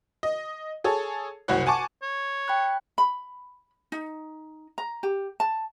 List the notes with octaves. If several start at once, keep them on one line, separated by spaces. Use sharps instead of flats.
D#5
G#4 A4 C#5
F#1 C2 F#4 C#5 F#5
F#5 G#5 A5 C#6 D6
C#5
G5 B5 F#6
B5
D#4
A#5
G4
A5